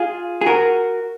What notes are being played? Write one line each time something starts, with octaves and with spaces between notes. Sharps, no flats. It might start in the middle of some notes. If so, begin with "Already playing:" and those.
Already playing: F4 G#4
G#4
F#4 A#4